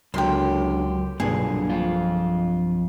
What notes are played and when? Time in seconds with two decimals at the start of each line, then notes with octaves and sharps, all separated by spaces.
0.14 C#2 F#2 D3 F#3 G4 C6
1.20 B1 G2 A#2 D3 G#4
1.69 F2 F4